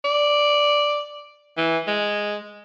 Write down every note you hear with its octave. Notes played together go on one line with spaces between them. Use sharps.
D5
E3
G#3